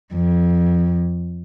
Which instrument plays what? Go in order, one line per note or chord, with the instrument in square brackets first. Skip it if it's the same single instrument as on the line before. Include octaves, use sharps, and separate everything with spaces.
[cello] F2